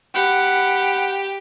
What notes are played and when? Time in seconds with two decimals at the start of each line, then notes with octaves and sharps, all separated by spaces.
0.14 G4 F#5 B5